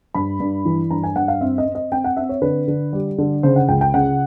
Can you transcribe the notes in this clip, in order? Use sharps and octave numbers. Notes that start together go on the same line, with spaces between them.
G2 B5
G2
E3
G2 A#5
G#5
G2 F#5
F5
C4 E5
D#5
C4
D#5
C4 G5
F#5
C4 E5
C#5
D3 B4
D3
G3
D3
C#3 C5
F#5
C#2 G5
G5
C#3 F#5